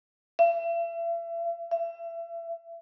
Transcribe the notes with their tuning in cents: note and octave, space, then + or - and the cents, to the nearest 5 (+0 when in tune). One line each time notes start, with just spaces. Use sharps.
E5 +40
E5 +35